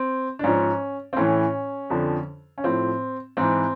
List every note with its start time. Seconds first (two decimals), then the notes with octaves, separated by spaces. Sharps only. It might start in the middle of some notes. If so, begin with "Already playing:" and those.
Already playing: C4
0.39 D4
0.44 G#2 F3 C#4
1.13 C4
1.17 A2 E3 C#4
1.90 F2 D3 F3
2.58 C#4
2.64 A2 F3 C4
3.37 G#2 E3 C4